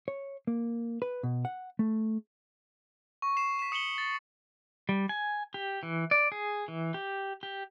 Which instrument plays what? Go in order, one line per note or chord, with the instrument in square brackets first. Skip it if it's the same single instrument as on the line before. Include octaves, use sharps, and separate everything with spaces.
[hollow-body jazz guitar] C#5
A#3
B4
B2
F#5
A3
[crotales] C#6
C7 E7
B6 E7
D#6 C#7 E7 F#7 G7
A6
[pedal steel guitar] G3
G#5
G4
E3
D5
G#4
E3
G4
G4